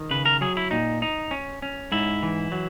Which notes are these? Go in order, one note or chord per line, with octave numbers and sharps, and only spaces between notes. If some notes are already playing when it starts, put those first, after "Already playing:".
Already playing: D#3
C#3 B4
A#4
F#3 G#4
E4
A#2 D#4
D#4
C#4
C#4
G#2 E4
E3
F#3